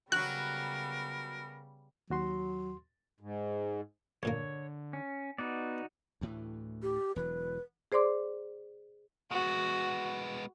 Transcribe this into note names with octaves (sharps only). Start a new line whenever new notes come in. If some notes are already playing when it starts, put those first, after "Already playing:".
C#3 F#3 G3 B3 F#4 A#4 F#6
D#2 F#3 F#4 C6
G#2
G2 A#2 D3 A#3 C#5
C#4
B3 D#4 F#4 D5
D2 A2 E3
G4
E1 E3 F#3 B4
G#4 C5 D5 C6 D6
G#3 B3 F#4